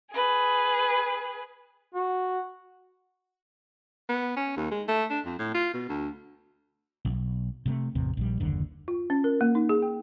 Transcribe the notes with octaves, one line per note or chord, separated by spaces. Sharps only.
G#4 B4
F#4
B3
C#4
D#2
G#3
A3
D4
F2
A2
F4
B2
D2
B1
C3 G#3 A3
A1 E2 C3
A#1 D#3 G3
F#1 D#2 D3
F4
C#4
A#4
A#3
D#4
G#4
G5